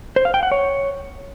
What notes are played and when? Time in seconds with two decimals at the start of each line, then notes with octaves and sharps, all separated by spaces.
0.16 C5
0.25 F5
0.34 G5
0.43 F#5
0.52 C#5